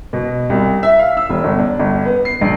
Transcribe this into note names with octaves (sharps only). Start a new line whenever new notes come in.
B2
C2
E5
F5
E6
E1
G1
D4
G1
B3
C7
A#1